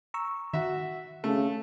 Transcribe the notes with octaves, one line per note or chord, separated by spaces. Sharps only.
A#5 C#6 E6
D#3 F#4 E5
C#3 A3